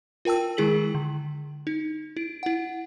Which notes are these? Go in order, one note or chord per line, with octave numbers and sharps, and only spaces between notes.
F4 A#4 G5 A5 E6
D#3 G#3 E4 G#4 B6 F#7
D3
D#4
E4 D7
E4 F#5